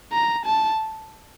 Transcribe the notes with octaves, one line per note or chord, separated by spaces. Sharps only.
A#5
A5